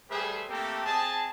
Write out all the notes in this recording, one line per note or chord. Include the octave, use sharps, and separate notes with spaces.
G3 A3 G#4 B4 C5 E5
A3 A#3 C4 G4 A4 A#4
C4 G#4 D#5 A5